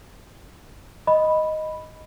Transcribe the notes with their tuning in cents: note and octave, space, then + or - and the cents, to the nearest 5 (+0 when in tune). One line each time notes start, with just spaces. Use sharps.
D#5 +0 B5 +0